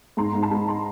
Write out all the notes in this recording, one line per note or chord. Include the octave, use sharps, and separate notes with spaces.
G#2 A#5 C6
G#2
A5 B5
G#3
A#5 C6